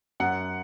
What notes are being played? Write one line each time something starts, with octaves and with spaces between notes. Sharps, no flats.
F#2 F#5